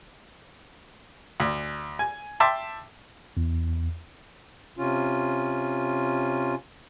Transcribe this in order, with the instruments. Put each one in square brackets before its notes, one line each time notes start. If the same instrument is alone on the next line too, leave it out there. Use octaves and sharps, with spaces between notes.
[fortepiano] D2
G#5
E5 G5 A5 C6 D6
[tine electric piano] E2
[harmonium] C3 C#4 F4